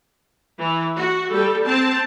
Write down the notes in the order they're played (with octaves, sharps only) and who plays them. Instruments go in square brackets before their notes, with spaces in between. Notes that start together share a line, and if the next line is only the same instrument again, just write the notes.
[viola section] E3
F#4
G3 A4
C4 A5